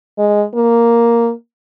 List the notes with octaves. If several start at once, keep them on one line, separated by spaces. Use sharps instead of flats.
G#3
A#3